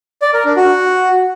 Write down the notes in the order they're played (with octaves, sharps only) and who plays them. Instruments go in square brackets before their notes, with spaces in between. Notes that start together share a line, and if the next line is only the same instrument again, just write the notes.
[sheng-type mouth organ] D5
A#4
D4
F#4